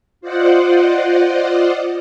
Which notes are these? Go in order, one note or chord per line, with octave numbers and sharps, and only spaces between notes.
F4 C5 D5 D#5 F#5